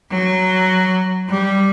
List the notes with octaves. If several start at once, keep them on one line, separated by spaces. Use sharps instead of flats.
F#3
G3